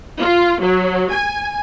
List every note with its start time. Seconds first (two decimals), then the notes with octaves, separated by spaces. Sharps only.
0.21 F4
0.61 F#3
1.12 G#5